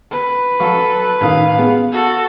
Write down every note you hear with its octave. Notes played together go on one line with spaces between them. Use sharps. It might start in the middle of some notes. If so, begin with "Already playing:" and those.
B4
F#3 A4 F5 C#6
A1 D#3 F5 D#6
B3 G#4
F#4 A4